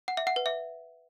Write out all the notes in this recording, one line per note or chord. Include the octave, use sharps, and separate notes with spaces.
F#5
E5
F#5
B4
E5